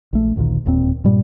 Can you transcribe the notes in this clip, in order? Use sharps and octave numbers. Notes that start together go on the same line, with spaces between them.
A#1 A3
A1 D2 A#2 D#3
E1 D#2 A#2 C4
G2 A#2 G3